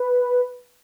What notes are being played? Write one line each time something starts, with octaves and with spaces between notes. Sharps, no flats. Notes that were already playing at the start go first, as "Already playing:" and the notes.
Already playing: B4